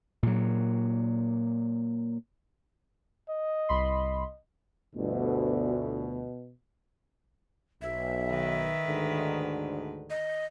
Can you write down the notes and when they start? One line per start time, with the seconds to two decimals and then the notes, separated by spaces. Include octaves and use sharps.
0.23 A#2 F#3
3.30 D#5
3.69 C2 B5 C6
4.95 G1 D2 B2
7.82 B1 E5
8.30 D#3 B4
8.86 D2 G#2 D3
10.10 D#5